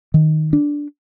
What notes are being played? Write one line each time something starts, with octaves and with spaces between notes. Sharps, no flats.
D#3
D4